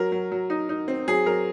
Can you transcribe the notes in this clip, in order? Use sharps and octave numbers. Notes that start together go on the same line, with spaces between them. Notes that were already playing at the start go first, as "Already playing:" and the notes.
Already playing: F#3 A#4
F#3
F#3
D#4
D#4
C4
F#3 G#4
F#3 A#4